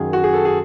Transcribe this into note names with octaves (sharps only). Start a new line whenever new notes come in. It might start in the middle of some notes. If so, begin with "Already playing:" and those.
Already playing: F#2 D#3 F#3 G#4
F#4
G#4
A4
G#4